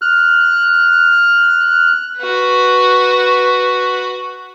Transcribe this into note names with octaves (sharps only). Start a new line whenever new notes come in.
F6 F#6
F#4 B4